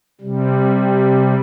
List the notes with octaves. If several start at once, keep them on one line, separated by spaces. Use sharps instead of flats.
C3 G3